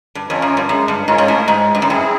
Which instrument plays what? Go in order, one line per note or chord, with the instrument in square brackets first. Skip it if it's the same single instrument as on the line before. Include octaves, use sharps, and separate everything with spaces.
[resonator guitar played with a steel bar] G2
[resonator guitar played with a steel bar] F2 [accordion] C#4 F4 A#4 C#5
[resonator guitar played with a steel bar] F#2
G2
[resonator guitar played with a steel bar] F#2 [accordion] G#3
[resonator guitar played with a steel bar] G2
[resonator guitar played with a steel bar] G#2 [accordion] C#4 F4 A#4 C#5
[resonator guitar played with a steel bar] G#2
A2
[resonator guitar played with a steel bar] G#2 [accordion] G#3
[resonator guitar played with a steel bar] G2
F#2
[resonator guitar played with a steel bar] G2 [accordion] C4 E4 G#4